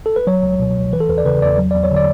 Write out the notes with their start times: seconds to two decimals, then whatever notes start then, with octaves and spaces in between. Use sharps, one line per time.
0.06 A4
0.16 B4
0.27 F#3 C#5
0.43 C#2
0.59 B2
0.76 C#2
0.92 E3 B4
1.00 A4
1.08 E2 B4
1.18 D5
1.25 C#3 B4
1.41 E2 D5
1.58 F#3
1.71 E2 D5
1.84 C#5
1.91 D3
1.96 D5